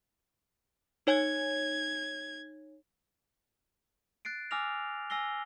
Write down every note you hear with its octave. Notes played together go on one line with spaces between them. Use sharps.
D#4 C#5 G#5 G#6
F#6 A6 C7 D7
G#5 D6 E6 F6 A#6 F7
G#5 E6 A#6 C7 G7